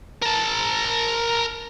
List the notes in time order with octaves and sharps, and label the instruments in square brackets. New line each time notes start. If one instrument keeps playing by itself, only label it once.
[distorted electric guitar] A#4 A5